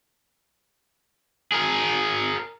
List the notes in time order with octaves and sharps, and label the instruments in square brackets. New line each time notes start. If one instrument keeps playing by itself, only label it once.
[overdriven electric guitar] G#4 A#4